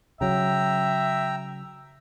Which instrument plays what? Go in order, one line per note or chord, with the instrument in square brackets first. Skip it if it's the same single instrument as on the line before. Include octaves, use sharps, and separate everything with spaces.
[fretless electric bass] C#3 F#3 [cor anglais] E5 [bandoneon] G5 A#5